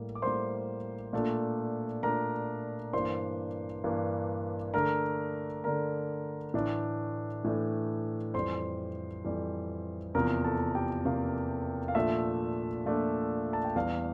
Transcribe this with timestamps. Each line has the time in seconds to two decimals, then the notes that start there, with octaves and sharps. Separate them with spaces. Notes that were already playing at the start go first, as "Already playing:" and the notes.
Already playing: A2 G3 A#3
0.15 D6
0.22 A2 G3 A#3 C5 C6
1.13 A#2 A3 D4
2.03 A#2 A3 D4 A#4 A#5
2.93 G2 E3 A#3 D4 C5 C6
3.84 G2 E3 A#3 D4
4.74 D3 A3 D4 A#4 A#5
5.64 D3 A3 D4 A#4 A#5
6.54 A2 E3 A3 D4
7.44 A2 E3 A3 D4
8.34 F2 E3 G3 C5 C6
9.25 F2 E3 G3
10.15 E2 C3 F3 A#3 A#4 A#5
10.44 A4 A5
10.75 G4 G5
11.05 E2 C3 F3 A#3 F5
11.88 F5
11.95 A#2 F3 A3 D4 E5
12.86 A#2 F3 A3 D4
13.53 A5
13.64 G5
13.76 E2 E3 G3 F5